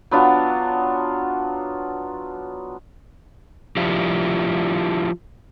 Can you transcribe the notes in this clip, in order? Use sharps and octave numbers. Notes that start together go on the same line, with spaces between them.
F#3 B3 D4 F4
F3 D4 E4 F4 G4